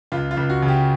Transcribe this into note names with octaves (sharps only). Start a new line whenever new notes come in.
C#2 F4
F4
C#2
F#4
C#3
G4